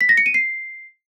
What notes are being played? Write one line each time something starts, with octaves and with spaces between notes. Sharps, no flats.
B6
A#6
C#7
D#7
C7